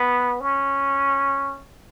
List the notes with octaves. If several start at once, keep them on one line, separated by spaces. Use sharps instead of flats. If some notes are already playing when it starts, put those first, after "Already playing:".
Already playing: B3
C#4